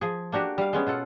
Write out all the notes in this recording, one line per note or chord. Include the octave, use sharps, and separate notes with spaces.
F3 G#4
A#3 D4 F#4 G4
G3 F5
G#3 B3 C#4
B2 F4 A4 F#5